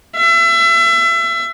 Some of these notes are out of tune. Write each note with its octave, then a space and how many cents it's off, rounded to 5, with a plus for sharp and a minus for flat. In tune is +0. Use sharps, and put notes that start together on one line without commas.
E5 +30